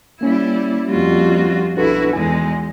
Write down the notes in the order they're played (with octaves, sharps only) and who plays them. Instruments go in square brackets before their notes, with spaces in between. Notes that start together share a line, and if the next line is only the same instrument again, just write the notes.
[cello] G3 E4 [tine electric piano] A#3 C#4
[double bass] F2 G3 [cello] F4 F#4
[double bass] B1 [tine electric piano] D4 A4 B4 [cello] E4 F#4
[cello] E2 G#3 [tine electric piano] G#5